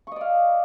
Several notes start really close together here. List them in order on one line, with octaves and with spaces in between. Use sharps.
C#6 D#5 D5 F5